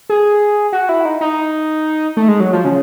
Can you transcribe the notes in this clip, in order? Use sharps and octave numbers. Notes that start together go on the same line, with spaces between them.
G#4
F#4
E4
D#4
D#4
A3
G#3
F#3
F3
C#3